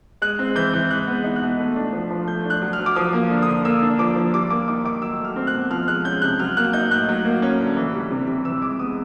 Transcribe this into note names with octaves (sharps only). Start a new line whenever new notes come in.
G#3 F#6
C4
E3 G6
E3
G#3 F#6
B3
D#4
F#6
B2
A3
D4
F3
F3
A3 G6
D4
F#6
F#3
F6
F#3
D6
F3 D#6
A#3
D3
D#6
D3
A#3 E6
D4
F3 D6
F3
G3 D6
A#3 D6
D#3 D6
D#3 D6
F#3 E6
A3 F6
C4
F#6
B2
F3 F6
G#3 F#6
C#4 G6
C3 F#6
F#3 F6
A#3 F#6
D#4 G6
A2 F#6
F#3
A#3
C#4
D3
E3
G3
C3
C3
E3 E6
G#3 D6
B3 D#6